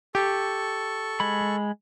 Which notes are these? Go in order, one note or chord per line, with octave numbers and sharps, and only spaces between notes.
G4 A4 C#6
G#3 B5